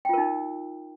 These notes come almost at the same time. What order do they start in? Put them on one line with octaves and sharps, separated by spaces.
G5 F4 A#4 D#4